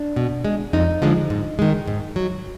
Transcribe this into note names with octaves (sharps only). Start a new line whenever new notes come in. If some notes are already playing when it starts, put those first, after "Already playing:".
Already playing: D4
B2
G#3
F2 D#4
D3 F3 G#3
G#2
D#3 G#3
G#2
F#3